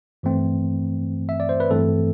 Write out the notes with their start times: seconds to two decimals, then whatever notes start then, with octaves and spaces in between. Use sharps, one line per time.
0.23 G2 E3 A3 C4
1.29 E5
1.40 D5
1.49 C5
1.60 B4
1.71 G2 E3 A3 C4 A4